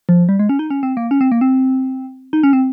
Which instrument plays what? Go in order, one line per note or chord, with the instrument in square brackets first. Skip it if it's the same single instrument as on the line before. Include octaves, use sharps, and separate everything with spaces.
[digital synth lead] F3
G3
G#3
C#4
D#4
C#4
C4
A#3
C#4
C4
A#3
C4
D#4
C#4
C4